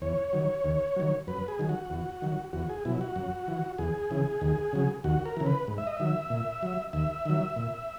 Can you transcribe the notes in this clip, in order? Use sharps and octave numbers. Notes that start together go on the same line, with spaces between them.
E2 C#5
D#3 F#3
D#2
D#3 F#3
F#2 B4
G#4
D#3 F#3
F#4
E2
D#3 F#3
E2 F#4
G#4
B2 F#3 E4
F#4
F#2
E3
E2 G#4
C#3 E3
D#2
C#3 F#3
D#2 F#4
A#4
C#3 E3
B4
G#2
E5
D#5
D#3 F#3 E5
A#2
F#3
D#2 E5
D#3 F#3
A#2